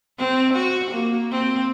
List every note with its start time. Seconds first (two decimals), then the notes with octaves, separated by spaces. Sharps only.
0.18 C4
0.54 F#4
0.91 A#3
1.31 C4